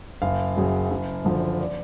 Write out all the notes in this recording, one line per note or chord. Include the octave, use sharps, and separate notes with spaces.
F#1 F5
F#2 C#3 F#3
F#1
F#2 D3 F3
D5